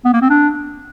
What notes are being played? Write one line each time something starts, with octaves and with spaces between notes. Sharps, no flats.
B3
A#3
C4
D4